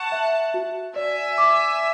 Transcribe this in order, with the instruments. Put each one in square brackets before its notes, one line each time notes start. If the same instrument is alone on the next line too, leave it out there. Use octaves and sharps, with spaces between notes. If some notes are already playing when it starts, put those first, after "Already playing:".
Already playing: [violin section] F#5 A5 [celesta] C#6
[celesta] E5
F#4
[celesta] D5 [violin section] E5 G#5
[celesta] D6